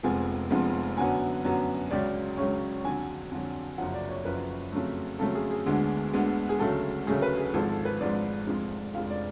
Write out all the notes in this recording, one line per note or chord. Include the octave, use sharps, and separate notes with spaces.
F1 F2 F3 G#3 B3 G#5
F1 F2 F3 G#3 B3
F#2 D3 F#3 B3 G#5
F#2 D3 F#3 B3
C#2 C#3 F#3 D5
C#2 C#3 F#3 C#5
F2 D3 F#3 G#5
F2 D3 F#3
F#1 F#2 F3 F#5
D5
C#5
F#1 F#2 F3 B4
F2 C#3 F#3 A3
F2 C#3 F#3 A3 A4
G#4
G#4
D2 D3 G#3 B3
D2 D3 G#3 B3
G#4
D2 C#3 F#3 A3 A4
D2 C#3 F#3 A3 G#4
B4
G#4
G#1 G#2 F3 G#3 A4
A4
B4
G#1 G#2 F3 G#3 D5
F1 F2 F3 G#3
F1 F2 F3 G#3 F5
D5